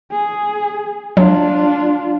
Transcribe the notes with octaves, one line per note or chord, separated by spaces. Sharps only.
G#4
F#3 D4 F4